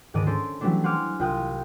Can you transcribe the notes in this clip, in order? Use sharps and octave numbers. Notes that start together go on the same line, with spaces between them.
D2 G#2 D#3 D5 D#5 D#7
C#4 D4 A4 C5 D5
E3 F#3 G3 A3 C#4 D4
C5 F#5 G#5 D6 F6
C2 F4 G5 D#6 F#6